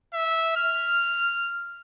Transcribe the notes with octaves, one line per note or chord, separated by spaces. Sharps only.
E5
F6